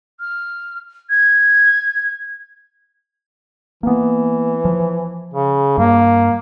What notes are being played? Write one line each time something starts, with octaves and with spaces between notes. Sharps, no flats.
F6
G#6
E3 A#3 B3
F3
C#3
G2 A#3